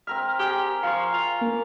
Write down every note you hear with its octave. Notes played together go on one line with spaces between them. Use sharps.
C4 A#4 E5 F6
G4 G#4
F3 F5 C6 C#6
F4
A#3